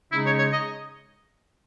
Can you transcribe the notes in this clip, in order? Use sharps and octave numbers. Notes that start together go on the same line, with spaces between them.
C#3 G#3 D#4 E4
C#5
C#5
D#5